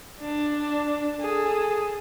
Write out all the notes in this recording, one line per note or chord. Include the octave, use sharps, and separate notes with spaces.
D4
G#4 A4